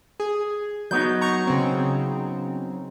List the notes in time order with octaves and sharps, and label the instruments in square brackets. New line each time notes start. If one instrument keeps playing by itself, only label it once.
[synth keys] G#4
[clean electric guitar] F#3 B3 D#4 [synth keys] G6
[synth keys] A#5 C#6
C#3 C4